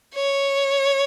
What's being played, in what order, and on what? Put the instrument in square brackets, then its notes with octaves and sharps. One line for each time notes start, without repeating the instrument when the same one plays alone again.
[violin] C#5